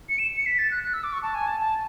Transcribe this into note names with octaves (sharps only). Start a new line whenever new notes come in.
C#7
E7
C#7
B6
A6
F#6
F#6
E6
D6
C#6
A5
G#5
A5
A5